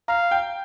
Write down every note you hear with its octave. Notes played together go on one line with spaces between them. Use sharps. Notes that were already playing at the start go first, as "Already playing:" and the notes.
F5 A#5
G5